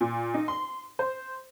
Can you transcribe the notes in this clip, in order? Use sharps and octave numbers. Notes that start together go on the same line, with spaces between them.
A#2
D#4
C6
C5